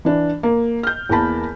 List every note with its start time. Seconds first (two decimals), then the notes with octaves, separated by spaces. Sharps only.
0.05 E3 D4
0.43 A#3
0.83 F6 G6
1.09 E2 A#3 A#4 A5 B5